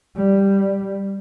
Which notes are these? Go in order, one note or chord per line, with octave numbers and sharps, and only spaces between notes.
G3